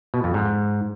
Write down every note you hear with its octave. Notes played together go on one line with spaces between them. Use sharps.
B2
F2
G#2